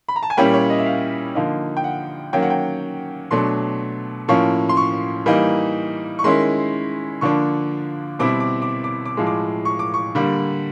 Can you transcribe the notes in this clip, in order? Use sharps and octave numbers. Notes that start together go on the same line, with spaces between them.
B5
A#5
A5
G#5
A#2 G3 A#3 C#4 E4 G5
C#5
D#5
E5
F5
D3 F3 A#3 D#4
G5
F#5
D#3 F#3 A#3 C#4 G5
F#5
G5
B2 F#3 A3 D4 C6
A2 F3 A#3 C#4 C#6
C6
C#6
E3 G3 A#3 D#4
C#6
D#3 G#3 C#4 E4 C6
D3 F3 A#3 D4 C#6
B2 G3 C4 E4 D6
D6
D6
D6
D6
A2 F3 G#3
D6
C#6
D6
C#6
D3 G3 A#3